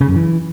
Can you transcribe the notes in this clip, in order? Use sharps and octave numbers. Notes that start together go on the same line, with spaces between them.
C#3
F#2
E3